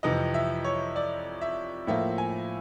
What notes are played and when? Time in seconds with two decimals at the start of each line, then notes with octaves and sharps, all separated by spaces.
0.03 F2 C3 E3 D#5
0.34 E5
0.64 C#5
0.96 D5
1.41 E5
1.87 A2 F3 A#3 E5
2.18 G#5